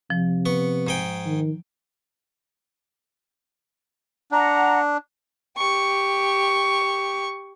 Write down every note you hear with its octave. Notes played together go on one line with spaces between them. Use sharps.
C3 F3
B3 C#6
G#2 G#4 G5
D#3
D4 F#5 A#5
G4 C#6